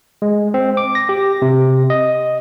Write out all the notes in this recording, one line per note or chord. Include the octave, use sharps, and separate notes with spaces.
G#3
C4
D6
A#6
G4
C3
D#5